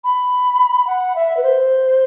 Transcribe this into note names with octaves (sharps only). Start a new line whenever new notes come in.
B5
F#5
E5
B4
C5